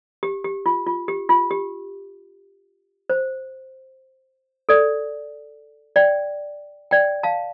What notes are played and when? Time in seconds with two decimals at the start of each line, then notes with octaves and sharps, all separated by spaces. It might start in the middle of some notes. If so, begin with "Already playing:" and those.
0.23 G4
0.44 G4
0.66 F4
0.87 F4
1.08 G4
1.29 F4
1.51 G4
3.10 C5
4.69 A4 D5
5.96 D5 G5
6.91 D5 G5
7.23 F5 A5